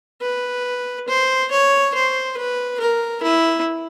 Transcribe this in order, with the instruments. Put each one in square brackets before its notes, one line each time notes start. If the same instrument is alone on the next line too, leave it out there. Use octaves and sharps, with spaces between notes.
[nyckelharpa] B4
C5
C#5
C5
B4
A#4
E4